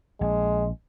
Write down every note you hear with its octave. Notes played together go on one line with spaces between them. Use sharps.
A#1 G#3